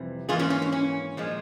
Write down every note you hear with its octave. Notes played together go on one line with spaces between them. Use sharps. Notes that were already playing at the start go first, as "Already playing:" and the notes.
Already playing: F2 C3 E3 G3
G#2 E3 A#3 F4 G#4
C#4 F4
C#4
C#4
C#4
A#2 F3 G#3